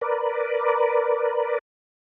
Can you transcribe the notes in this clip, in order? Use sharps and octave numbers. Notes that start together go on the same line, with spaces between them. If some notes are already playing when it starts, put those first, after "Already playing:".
A#4 B4 D5